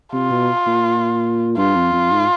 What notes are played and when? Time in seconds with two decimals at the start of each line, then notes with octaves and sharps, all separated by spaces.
0.13 C3 F4
0.31 B2
0.67 A#2
1.57 G2 F4
1.75 F2
1.93 F2
2.11 G#2